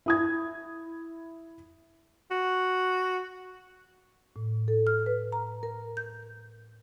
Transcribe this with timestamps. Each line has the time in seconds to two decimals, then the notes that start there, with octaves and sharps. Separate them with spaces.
0.06 E4 D#6 G#6
2.31 F#4
4.36 A2
4.68 A4
4.87 F6
5.06 B4
5.32 A#5
5.63 A#4
5.97 G6